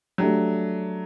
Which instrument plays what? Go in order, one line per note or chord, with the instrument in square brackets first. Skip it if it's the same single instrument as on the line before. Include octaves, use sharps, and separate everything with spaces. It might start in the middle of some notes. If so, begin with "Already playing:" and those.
[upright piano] F#3 [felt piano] A3 D4 G4